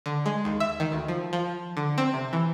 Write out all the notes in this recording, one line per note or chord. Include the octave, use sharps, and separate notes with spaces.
D3
G#3
D#2
E5
D#3
D2
F3
F3
D3
C4
C3
E3